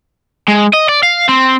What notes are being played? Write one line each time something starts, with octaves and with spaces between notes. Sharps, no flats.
G#3
D#5
D5
F5
C4